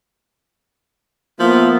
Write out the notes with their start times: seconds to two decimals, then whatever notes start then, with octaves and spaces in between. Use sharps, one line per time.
1.40 F3 A#3 B3 F4 E5